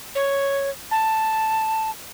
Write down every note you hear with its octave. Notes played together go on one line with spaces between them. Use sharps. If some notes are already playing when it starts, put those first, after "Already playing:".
C#5
A5